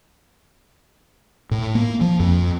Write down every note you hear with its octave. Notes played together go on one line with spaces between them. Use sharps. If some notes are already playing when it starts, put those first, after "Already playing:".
A2
A#3
F3
F2